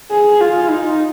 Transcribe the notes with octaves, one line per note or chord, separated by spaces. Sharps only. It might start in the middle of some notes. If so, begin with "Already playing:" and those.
G#4
F4
D#4